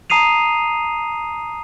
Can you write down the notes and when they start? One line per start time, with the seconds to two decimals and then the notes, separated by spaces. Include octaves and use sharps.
0.10 A5 A#5 D#6 C7 D#7 F7